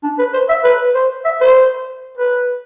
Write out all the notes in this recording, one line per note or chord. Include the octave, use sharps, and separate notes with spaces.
D4
B4
C5
E5
B4
C5
E5
C5
B4